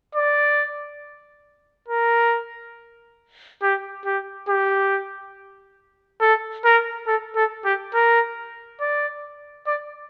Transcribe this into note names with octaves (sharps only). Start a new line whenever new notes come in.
D5
A#4
G4
G4
G4
A4
A#4
A4
A4
G4
A#4
D5
D5